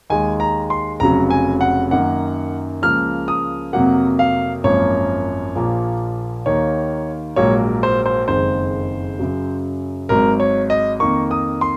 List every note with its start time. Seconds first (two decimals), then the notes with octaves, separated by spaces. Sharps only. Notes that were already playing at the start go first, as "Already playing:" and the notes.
0.10 D#2 D#3 G#3 G#5
0.40 A#5
0.70 C6
1.00 F1 F2 C#3 F#3 A#5
1.30 G#5
1.61 F#5
1.91 F#2 D#3 A#3 F#5
2.82 C#2 C#3 F3 A#3 F6
3.28 D#6
3.73 F2 C3 F#3 A#3 F#5
4.19 F5
4.64 G#1 F#2 F3 A#3 C#5
5.55 A#1 A#2 F3 A#3
6.46 D#2 D#3 A#3 C#5
7.36 A#1 G#2 F#3 A#3 C#5
7.83 C5
8.06 C5
8.28 F#1 F2 D#3 G#3 C5
9.19 F#2 C#3 F#3
10.09 G#1 G#2 F#3 A#4
10.40 C#5
10.70 D#5
11.00 F2 D#3 A#3 C#6
11.31 D#6
11.61 C6